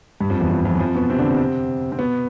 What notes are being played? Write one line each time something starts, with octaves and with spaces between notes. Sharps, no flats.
G2 G3
F2 F3
E2 E3
F2 F3
F2 F3
E3
F2 F3
B2 B3
C3 C4
D3 D4
C3 C4
C4
B2 B3